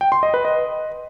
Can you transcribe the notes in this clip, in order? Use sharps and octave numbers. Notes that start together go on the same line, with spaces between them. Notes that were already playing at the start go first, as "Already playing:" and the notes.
G5
C6
D#5
B4
D#5